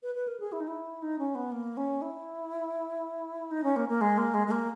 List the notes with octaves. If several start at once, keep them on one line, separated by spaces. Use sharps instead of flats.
B4
B4
A#4
G#4
E4
D#4
E4
D#4
C#4
B3
A#3
C#4
E4
D#4
C#4
A#3
A#3
G#3
A#3
G#3
G#3
A#3